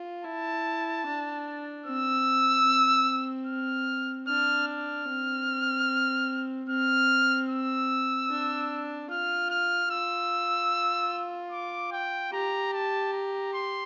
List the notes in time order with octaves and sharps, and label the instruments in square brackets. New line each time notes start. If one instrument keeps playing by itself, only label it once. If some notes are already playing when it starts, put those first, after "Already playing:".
Already playing: [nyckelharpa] F4
[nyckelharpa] E4 [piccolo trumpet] A5
[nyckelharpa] D4
[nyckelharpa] C4 [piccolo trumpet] E6
[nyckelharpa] C4
[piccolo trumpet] F6
[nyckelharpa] D4 [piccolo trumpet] F6
[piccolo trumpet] F6
[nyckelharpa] C4
[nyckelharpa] C4 [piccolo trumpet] F6
[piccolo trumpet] E6
[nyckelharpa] D4
[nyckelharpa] F4 [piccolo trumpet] F6
[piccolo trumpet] F6
[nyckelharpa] F4 [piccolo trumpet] E6
[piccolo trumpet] D6
G5
[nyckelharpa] G4 [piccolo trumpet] A#5
[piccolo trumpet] A5
A#5
C6